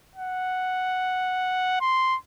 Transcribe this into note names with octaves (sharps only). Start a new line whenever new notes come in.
F#5
C6